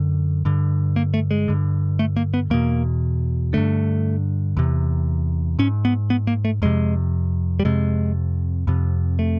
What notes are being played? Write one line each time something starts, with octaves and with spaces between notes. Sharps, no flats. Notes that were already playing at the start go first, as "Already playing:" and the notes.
Already playing: F#2 D3
G2 D3
A#3
A3
G#3
G2 D3
A3
A#3
B3
E2 B2 A#3
G2 D3 A3
E2 C3
G#2 C#4
B3
B3
A#3
A3
F2 C3 G#3
G3
F2 C3 G#3
F2 C3
A3